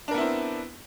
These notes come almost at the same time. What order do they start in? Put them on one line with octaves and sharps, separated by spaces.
D4 A#4 B3 E4 C4